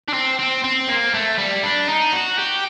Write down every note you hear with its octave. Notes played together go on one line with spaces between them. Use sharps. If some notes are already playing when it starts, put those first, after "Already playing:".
D4
C4
C4
C4
A#3
A3
G3
D4
D#4
F#4
G4